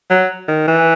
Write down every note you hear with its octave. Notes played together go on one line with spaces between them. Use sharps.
F#3
D#3
E3